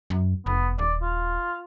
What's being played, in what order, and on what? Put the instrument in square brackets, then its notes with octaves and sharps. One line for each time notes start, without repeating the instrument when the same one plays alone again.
[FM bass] F#2
[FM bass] F1 [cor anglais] B3
[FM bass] D#1 [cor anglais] D5
[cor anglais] F4